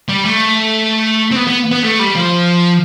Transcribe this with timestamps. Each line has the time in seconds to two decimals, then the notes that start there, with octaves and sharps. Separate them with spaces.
0.09 G3
0.24 A3
1.31 C4
1.36 B3
1.47 B3
1.71 B3
1.83 A3
1.99 G3
2.15 F3